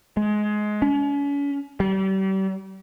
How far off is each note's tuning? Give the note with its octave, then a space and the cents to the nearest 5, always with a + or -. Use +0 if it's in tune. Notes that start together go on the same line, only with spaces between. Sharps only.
G#3 +20
C#4 +40
G3 -35